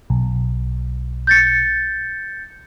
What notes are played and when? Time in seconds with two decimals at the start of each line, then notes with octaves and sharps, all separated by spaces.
0.10 B1
1.27 G6 A6 C#7